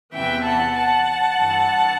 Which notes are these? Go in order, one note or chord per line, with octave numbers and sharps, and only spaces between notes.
E2 C3 E3 E5 G5
F#5 A5
F#5 A5
G2 E3